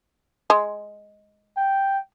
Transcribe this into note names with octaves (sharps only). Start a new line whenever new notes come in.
G#3
G5